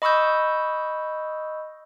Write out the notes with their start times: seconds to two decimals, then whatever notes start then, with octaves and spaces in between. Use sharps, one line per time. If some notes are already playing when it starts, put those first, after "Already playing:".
0.02 D#5 B5 C#6 D#6 E6 G6